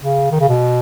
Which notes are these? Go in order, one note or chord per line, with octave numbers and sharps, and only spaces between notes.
C#3
D#3
C#3
B2